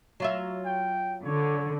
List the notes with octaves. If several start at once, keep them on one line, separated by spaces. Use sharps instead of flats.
F#3 F4 E5
G5
D3 C#5